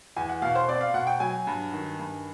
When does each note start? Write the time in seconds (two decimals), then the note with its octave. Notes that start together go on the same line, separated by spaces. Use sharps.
0.16 E2 G#5
0.29 F#5
0.42 B2 F5
0.55 C5
0.68 C4 D5
0.81 F5
0.94 B2 F#5
1.07 G5
1.20 F#3 G#5
1.47 G2
1.73 D#3
2.00 G2